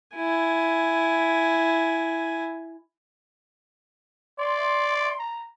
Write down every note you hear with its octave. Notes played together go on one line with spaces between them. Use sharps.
E4 G#5
D5 C6
A#5